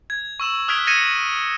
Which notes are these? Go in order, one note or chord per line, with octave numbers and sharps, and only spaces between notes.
G#6
C#6 E6 E7 F#7
D#6 F6 F#6 G#6 B6 D7
G#6 A#6 C#7 D#7 E7